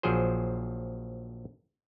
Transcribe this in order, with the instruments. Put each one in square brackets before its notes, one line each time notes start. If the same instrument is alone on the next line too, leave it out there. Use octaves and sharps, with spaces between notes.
[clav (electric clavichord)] A#1 F3 F#3 G#4 C5